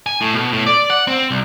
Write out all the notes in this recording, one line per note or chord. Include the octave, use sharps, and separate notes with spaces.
G#5
A2
B2
A2
D5
F#5
C4
C2